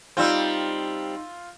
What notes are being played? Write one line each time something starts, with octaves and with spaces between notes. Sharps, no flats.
G3 C4 D#4 F4 E6 G6